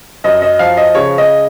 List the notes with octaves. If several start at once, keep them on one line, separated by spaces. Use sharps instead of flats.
F#2 D#5
D#5
F3 F5
D#5
C#3 C#5
D#5